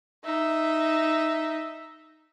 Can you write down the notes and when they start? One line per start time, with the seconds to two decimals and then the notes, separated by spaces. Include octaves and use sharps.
0.24 D#4 E5